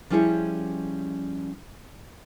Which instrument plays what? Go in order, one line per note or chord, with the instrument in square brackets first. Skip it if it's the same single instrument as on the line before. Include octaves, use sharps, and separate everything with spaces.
[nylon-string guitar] F3 G3 C#4 E4 G#4 C#5